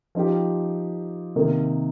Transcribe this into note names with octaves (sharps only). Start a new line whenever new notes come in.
F3 D#4 G4
C3 D#3 A#3